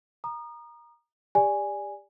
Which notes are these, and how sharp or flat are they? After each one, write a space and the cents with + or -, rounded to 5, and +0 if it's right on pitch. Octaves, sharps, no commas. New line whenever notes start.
A#5 +15 D#6 -30
G4 +30 D5 +0 G#5 -10